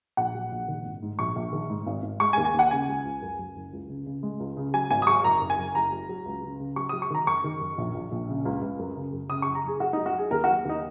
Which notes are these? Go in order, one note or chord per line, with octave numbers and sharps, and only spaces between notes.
A#1 F#5
F#3
A#1
D#3
G#1
G#2
A#1 C#6
A#1
D#3
G#2
G#1
G#1
G#3 C#6
G#5
D#2
G#5
D#2 F#5
C#3 G#5
C#2
C#2
F#2
F#2
F#1
C#2
C#3
C#3
G#3
C#2
C#3
F#3 G#5
G#1 G#5
D#6
F#3 C#6
F#1 A#5
F#2
G#5
F#1
F#1 A#5
F#3
F#3
C#2
C#3
C#3
F#3 C#6
F#3 D#6
C#6
D#3 A#5
F#2 C#6
D#3
F#2
A#1
A#1
A#1
C#3
C#2
C#2
F#2
C#3
F#2
C#3 D#6
C#6
F#1
A#5
F#1 G#4
F#2 F#4
D#4
F#3
F#4
F#3 G#4
D#2 A#4
F#4
F#3
D#2 D#4